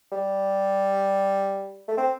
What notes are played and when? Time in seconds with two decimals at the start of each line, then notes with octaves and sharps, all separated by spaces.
0.12 G3
1.88 A3
1.97 C4